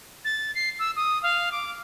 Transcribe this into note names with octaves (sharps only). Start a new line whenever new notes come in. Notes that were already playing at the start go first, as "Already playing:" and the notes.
A6
C7
E6
D#6
F5
D6